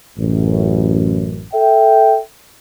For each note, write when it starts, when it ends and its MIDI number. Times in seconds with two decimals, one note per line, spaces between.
0.18 1.44 33
0.18 1.44 42
1.54 2.17 69
1.54 2.17 76
1.54 2.17 79